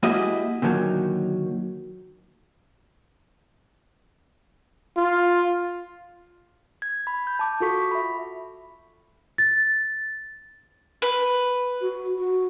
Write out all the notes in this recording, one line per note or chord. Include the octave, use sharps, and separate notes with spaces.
G#3 A#3 E4 F#4 G4 D#5
A#2 D3 D#3 F#3
F4
G#6
B5
G6
A5 D6
F4 F#4 A4 C#6 B6
E5 B5
A6
B4
F#4
F#4